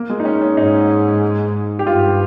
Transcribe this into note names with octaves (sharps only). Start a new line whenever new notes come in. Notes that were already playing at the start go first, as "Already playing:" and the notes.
Already playing: A#3
G#3
D#4
C#4
C#4
G#2 D#4
G4
G2 F4